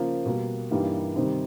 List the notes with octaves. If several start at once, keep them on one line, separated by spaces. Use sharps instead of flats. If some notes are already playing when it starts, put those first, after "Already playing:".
Already playing: C#3 F3 A#3
B2 G3 A#3
G2 E3 G3 A#3 D#4
C3 D#3 G3 C4 D#4